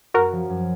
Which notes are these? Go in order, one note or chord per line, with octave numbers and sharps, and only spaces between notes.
F#2 F#4 A#4
F3
F#2